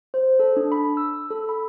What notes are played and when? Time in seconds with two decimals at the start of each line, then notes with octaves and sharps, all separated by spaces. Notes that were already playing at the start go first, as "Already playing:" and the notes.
0.14 C5
0.39 A4
0.57 D4
0.72 B5
0.97 E6
1.30 A4
1.49 B5